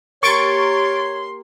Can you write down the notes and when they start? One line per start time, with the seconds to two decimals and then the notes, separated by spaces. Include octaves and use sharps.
0.23 A#3 G4 A#4 C#5 C6 C#6 A6 D7